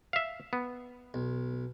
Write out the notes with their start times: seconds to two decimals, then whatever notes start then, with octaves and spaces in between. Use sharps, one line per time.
0.13 E5 F5
0.53 B3
1.14 B1